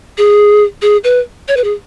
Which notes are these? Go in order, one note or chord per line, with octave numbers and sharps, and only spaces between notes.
G#4
G#4
B4
C#5
B4
G#4